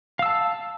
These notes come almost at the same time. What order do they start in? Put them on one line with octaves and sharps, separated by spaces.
F5 E6 A5